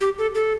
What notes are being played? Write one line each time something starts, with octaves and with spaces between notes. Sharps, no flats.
G4
A4
A4